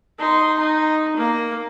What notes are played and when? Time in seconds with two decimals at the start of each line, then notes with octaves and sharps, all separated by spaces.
0.18 D#4 C6
0.59 D#4
1.16 A#3 A#4